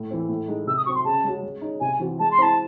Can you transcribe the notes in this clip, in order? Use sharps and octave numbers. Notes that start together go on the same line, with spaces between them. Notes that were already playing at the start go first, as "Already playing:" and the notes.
Already playing: A2
E3 C4
A2
G#3 D#4
C3 E6
D#6
F#3 C4 C#6
C6
C#3 A5
G#3 C#4 F#4
G#3
D#4 G#4 C#5
C3 G#5
E3 C4 F#4
G#3 A5
C6
C4 E4 C5 A5